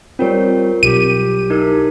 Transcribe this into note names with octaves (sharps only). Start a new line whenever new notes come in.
G3 C4 F4 A#4 C#5
B1 G4 D#7
D#4 E4 A#4